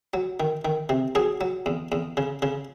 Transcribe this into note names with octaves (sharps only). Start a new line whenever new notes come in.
F#3
D#3
D#3
C3
F#3 G#4
F#3
E2
E2
C#3
C#3